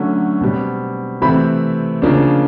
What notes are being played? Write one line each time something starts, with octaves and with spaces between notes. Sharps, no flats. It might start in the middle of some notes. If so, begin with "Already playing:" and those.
Already playing: D3 F#3 A3 C#4
B2 G3 C4
C3 E3 A3 C4 B5
C#3 F3 A#3 D4